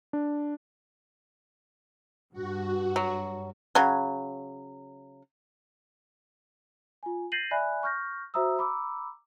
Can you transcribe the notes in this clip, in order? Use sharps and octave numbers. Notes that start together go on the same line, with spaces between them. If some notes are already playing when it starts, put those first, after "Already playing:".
D4
G2 F#4
F#3
C#3 F#3
F4 G#5
G6 A6 A#6 C7 D#7 F#7
D5 E5 G#5 B5 F#6
C#6 F6 G6 A#6
F#4 C5 E5 A#5 D#6 E6
A#5 B5 D6 E6